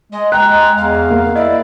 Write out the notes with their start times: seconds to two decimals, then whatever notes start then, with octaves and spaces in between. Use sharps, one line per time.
0.12 G#3 D#5
0.32 G5 A#5 F#6
0.48 G#3
0.77 E2 F5
1.10 A#3
1.36 E4 D5 D#5